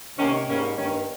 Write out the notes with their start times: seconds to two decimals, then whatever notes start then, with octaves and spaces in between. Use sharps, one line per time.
0.17 C3 D#3 A#3 C#4
0.47 G#2 G3 A#3 C#4
0.77 G2 D#3 A#3 C#4